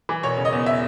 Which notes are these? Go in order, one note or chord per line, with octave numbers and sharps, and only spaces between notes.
E3
E1 C#5
C#3
D#5
E2
E5